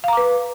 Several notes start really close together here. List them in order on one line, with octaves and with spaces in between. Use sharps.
F5 A#5 D6 B4